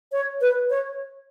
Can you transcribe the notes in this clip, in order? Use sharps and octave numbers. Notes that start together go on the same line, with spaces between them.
C#5
B4
C#5